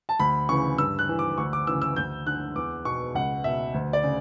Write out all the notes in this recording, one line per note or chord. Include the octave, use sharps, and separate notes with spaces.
A5
D2 B5
C#3 E3 C#6
G2 E6
F#6
E3
D6
D2 C#6
D6
C#3 E3 E6
E6
D2 G6
D3 F#6
E2 D6
B2 C#6
C#2 F#5
B2 E5
D2
D5
C#3